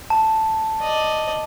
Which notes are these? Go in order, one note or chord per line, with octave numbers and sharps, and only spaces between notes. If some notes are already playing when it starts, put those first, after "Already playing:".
A5
D5 D#5